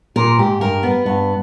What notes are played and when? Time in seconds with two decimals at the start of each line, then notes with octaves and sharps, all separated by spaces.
0.16 A#2 A#4
0.38 G#2 G4
0.61 G2 A#4
0.83 B3
1.05 G2 B3